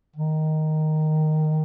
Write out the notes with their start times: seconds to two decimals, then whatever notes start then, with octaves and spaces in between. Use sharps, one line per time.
0.16 D#3